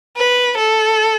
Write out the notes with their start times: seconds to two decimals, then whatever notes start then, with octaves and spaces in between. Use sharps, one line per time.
0.17 B4
0.58 A4